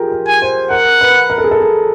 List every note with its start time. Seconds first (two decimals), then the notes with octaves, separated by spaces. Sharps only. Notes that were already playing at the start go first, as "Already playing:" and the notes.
Already playing: F4 G4 G#4 A#4
0.12 A#4
0.28 G#5
0.42 C5
0.71 A#4 F#5
1.01 B4
1.30 A#4
1.38 A4
1.44 G#4
1.51 A4
1.60 G#4